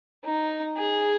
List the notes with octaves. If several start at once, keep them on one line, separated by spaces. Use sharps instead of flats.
D#4
G#4